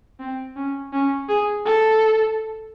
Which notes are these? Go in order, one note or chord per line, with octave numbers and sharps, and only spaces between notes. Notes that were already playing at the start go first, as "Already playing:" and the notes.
C4
C#4
C#4
G#4
A4